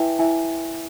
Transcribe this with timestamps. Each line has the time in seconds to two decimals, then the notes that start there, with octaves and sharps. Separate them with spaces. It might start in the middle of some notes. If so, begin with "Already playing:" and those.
Already playing: E4 B4 E5 G5 G#5
0.19 E4 E5 G#5